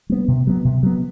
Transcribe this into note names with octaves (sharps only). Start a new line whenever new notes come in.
G3 B3
C3
F#3 B3
C3
F#3 B3